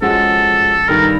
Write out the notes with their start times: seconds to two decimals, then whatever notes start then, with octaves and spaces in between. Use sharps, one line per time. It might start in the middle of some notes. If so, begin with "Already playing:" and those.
0.02 F3 G#3 C#4 F#4 A4
0.88 G2 D#3 G3 A#4